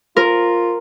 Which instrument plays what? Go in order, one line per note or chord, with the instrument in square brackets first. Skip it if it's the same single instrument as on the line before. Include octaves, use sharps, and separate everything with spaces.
[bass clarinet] F4 [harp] A#4